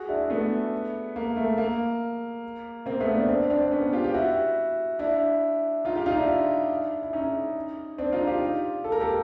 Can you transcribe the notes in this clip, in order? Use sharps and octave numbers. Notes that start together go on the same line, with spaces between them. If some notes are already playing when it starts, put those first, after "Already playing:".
Already playing: F#4 G#4
D4 E4
A3 B3
A#3
A3
A#3
A#3 C4
A3 B3
C4 D4
C4 D4
C4 D4
B3 C#4
F4 G4
G4
E4 F#4
D4 E4
D#4 F4
F4 G4
D#4 F4
D4 E4
E4
C#4 D#4
C4 D4
D#4 F4
F4 G4
A4
A#4
G4 A4